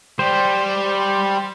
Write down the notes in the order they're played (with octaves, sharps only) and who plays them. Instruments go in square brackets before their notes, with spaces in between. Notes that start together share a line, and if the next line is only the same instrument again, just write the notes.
[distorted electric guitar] G3 [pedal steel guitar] C5